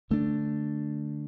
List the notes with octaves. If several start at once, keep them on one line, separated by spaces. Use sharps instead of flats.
D3 A3 D4